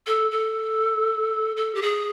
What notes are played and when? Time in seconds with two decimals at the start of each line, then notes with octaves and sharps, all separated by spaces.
0.07 A4
0.31 A4
1.57 A4
1.75 G4
1.82 G#4